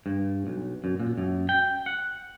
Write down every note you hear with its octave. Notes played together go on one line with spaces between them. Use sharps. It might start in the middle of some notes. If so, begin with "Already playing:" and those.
G2
B1
F#2
A#2
F#2
G5
F#5